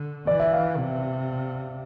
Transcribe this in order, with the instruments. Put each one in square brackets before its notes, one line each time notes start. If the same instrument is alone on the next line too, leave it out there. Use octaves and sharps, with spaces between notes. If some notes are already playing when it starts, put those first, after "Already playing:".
Already playing: [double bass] D3
[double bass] E3 [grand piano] D5
[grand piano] E5
F5
[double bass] C3